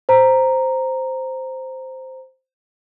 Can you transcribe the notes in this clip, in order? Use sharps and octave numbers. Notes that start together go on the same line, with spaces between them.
C5 A#5